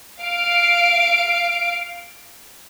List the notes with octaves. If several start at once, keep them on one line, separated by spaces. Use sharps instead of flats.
F5 D7